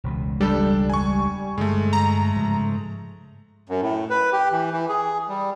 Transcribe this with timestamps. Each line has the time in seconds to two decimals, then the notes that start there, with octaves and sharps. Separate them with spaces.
0.04 E1 C#2 B2
0.41 G3 D4 A4
0.90 G#5 C#6
1.58 G2 D3 G#3 A3
1.93 A#5
2.36 G#2 C#3 F3
3.69 F#2
3.82 A2
4.10 B4
4.32 G4
4.51 E3
4.72 E3
4.89 G#4
5.28 G3